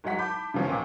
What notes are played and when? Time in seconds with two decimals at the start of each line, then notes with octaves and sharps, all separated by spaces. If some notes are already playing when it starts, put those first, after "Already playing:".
0.04 G#1 F#3 G#3 F#5 B6
0.18 A5 B5 D6 G6
0.54 C#3 E3 F3 B3 C#4
0.68 D#2 A#2 A#4 D6